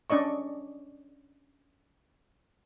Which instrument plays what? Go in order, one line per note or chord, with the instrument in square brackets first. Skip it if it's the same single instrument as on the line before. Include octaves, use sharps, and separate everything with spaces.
[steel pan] C#4 D4 D5 D#5 C#6